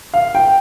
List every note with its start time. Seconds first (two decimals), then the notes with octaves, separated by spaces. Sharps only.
0.14 F5
0.35 G5